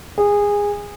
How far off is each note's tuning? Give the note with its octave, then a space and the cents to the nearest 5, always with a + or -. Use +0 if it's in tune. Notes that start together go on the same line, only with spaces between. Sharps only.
G#4 -20